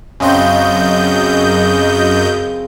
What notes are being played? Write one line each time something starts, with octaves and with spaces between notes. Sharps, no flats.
F#2 C#3 C4 D#5 G6